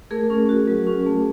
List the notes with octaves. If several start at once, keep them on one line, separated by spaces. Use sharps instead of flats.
A3 G#4 A#4
C#4
F#4
F#3
C#4
A3